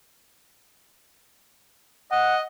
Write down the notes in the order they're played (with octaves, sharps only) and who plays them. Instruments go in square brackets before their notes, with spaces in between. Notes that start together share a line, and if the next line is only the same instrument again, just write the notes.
[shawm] D#5 [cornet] F#5